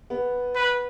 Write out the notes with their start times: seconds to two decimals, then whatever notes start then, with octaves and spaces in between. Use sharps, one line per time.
0.10 B3
0.56 B4